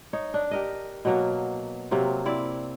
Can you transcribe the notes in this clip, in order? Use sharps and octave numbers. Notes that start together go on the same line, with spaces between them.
D#4 C#5
D4
G4 A#4 D#5
B2 F#3 A#3
C3 F#3 A#3 C4
C4 E4 D5